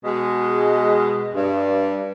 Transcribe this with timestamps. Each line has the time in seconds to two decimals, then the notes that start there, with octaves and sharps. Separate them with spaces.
0.04 B2 G#3
1.34 G2